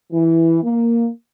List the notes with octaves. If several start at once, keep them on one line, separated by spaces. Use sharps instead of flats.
E3
A#3